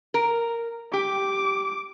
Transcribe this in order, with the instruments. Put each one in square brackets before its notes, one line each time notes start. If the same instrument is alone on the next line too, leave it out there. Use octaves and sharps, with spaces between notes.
[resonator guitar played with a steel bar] A#4
[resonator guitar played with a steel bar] G4 [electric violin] D6